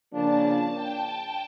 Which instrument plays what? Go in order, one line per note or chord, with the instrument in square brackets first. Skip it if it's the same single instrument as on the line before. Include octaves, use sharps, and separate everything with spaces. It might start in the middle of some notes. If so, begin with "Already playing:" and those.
[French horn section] C#3 F3 A#3 D4 [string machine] A5
[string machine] G5